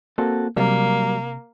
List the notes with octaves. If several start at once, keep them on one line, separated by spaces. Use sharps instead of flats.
A#3 C4 F#4 A4
C3 F#3 G3 A#3